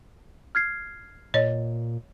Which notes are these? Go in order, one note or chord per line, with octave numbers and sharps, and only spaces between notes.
F6 G#6 C7
A#2 C#5 D#5